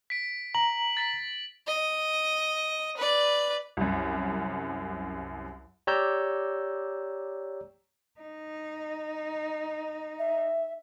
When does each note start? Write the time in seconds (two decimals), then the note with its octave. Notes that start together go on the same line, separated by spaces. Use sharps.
0.10 B6 D7
0.55 A#5 F#7
0.97 A6 B6 F#7
1.67 D#5
2.97 B4 D5
3.77 C2 F#2
5.87 G4 C#5 D5 A#5 E6 G6
8.20 D#4
10.19 E5